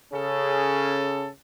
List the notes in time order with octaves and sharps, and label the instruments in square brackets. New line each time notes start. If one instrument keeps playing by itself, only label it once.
[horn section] C#3 C#4 G#4 A4